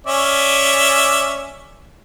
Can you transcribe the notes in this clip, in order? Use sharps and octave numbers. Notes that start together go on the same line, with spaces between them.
C#4 D5 E5